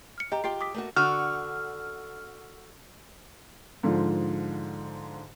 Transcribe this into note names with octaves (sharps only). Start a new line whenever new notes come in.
F6 C#7
G4 D#5 G5 A#5
F4 G4 G5 C7
D6 D#6 B6
A3 A#3 F#4
D3 F#4 F6
G#2 D3 F3 F4